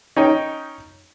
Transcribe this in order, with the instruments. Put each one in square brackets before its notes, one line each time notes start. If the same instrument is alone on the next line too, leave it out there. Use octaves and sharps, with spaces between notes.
[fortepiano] C#4 D#4 G5